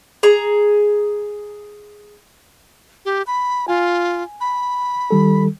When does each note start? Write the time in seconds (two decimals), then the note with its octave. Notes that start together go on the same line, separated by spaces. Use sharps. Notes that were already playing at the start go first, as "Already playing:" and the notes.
0.23 G#4 A#5
3.05 G4
3.27 B5
3.68 F4 G#5
4.41 B5
5.11 D#3 G3 A4